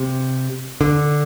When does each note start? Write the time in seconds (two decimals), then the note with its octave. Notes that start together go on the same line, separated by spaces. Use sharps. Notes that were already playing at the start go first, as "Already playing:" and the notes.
Already playing: C3
0.81 D3